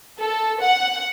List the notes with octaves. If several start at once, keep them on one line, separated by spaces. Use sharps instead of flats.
A4
F#5